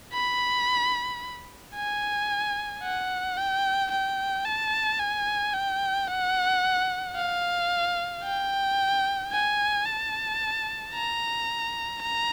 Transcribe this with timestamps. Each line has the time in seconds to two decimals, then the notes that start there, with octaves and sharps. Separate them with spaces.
0.13 B5
1.75 G#5
2.83 F#5
3.37 G5
3.91 G5
4.45 A5
4.99 G#5
5.54 G5
6.08 F#5
7.16 F5
8.24 G5
9.32 G#5
9.85 A5
10.93 A#5
12.02 A#5